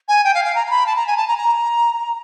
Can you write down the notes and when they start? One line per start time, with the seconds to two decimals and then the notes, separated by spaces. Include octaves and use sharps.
0.08 G#5
0.24 G5
0.34 F5
0.45 F5
0.55 A#5
0.67 A#5
0.70 B5
0.86 A5
0.96 A#5
1.07 G#5
1.17 A5
1.28 A#5
1.38 A#5